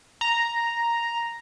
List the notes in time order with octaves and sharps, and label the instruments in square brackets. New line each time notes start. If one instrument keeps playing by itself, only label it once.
[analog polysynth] A#5